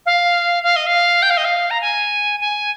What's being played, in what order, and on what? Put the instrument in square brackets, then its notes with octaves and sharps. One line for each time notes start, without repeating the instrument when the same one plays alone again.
[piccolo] F5
F5
D#5
F5
G5
F5
D#5
F5
A#5
G#5
G#5